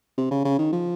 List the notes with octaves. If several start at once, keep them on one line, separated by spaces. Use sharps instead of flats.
C3
C#3
C#3
D#3
F3